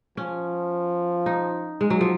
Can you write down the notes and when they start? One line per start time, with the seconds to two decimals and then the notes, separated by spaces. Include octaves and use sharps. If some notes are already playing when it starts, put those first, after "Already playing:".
0.17 F3 C#4
1.26 D#4
1.81 G#3
1.90 F#3
2.01 F3